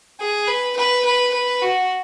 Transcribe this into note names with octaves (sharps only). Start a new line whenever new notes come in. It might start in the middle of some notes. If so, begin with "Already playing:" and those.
G#4
B4
B4
B4
B4
F#4